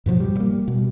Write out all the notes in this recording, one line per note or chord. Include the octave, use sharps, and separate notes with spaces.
G2 B2 F3 F#3
G3
G3 A#3
B2